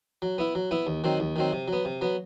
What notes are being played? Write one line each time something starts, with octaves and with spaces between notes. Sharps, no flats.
F#3
B3 E4
F#3
B3 E4
D#2
D#3 F#3 C4
D#2
D#3 F#3 C4
C3
F#3 B3
C3
F#3 B3